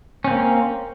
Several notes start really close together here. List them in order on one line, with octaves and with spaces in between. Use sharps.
C#4 C4 A#3